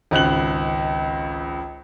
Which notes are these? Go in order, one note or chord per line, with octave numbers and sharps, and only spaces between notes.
G#1 C#2 F#6 F#7